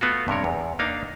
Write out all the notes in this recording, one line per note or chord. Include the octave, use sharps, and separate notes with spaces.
A3 B3 F4 F#4
G2 C3 A#4 C#5
E2
A#3 D4 D#4 F5